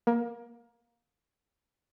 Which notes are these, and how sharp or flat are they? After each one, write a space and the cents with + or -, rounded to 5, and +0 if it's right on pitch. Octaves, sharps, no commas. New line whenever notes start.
A#3 +20